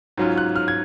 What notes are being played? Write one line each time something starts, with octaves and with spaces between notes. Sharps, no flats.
G#2 F#3 C#4 F4
F#6
F6
G#6